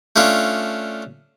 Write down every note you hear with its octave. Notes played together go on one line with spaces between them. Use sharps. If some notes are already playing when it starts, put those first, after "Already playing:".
A3 C#4 D4 F4